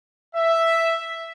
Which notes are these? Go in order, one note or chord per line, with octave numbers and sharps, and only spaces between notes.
E5